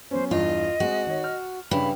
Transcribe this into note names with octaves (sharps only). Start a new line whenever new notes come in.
F#3 B3 C#4 C5
E2 G2 F4 D#5
G#3 C4 F#4
D#3 C#5
F6
G2 C#3 E3 B5